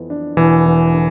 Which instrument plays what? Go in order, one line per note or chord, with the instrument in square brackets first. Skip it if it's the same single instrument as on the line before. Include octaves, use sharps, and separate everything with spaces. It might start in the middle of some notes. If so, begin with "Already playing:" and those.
Already playing: [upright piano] F2 E3 B3
D4
[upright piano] E1 [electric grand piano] E3
[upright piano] E2
D3